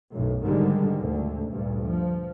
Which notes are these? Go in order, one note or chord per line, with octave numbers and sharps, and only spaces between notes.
B1 F#2 A2
G#2 D3 D#3 G3 G#3
D2 D3
D2 G2 A#2
F3